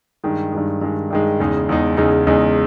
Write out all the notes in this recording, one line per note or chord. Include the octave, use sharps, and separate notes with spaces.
G2 D#3 G#3
G2 D#3 G#3
G2 D#3 G#3
G2 D#3 G#3
E2 C#3 G#3 D#4
E2 C#3 G#3 D#4
E2 C#3 G#3 D#4
E2 C#3 G#3 D#4